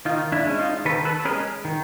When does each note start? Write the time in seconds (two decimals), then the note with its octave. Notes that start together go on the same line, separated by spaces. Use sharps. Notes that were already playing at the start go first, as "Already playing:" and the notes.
0.05 D#3 D#4 F4
0.32 D4 E4
0.46 G#3 C#4
0.59 D#4 F4
0.85 D#3 A4 B4
1.05 A4 B4
1.25 C#4 G#4 A#4
1.29 G#3
1.65 D#3